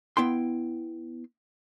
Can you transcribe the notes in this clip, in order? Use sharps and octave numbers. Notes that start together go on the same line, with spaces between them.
B3 E4 G5 C6